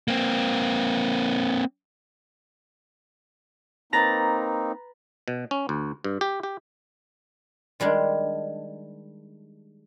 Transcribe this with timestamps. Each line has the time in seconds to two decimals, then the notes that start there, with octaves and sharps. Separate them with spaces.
0.08 A#3 C4
3.93 A#3 C4 D#4 B4 A#5 A6
5.28 B2
5.51 C#4
5.69 D2
6.04 G2
6.21 G4
6.43 G4
7.80 D#3 G3 G#3 D4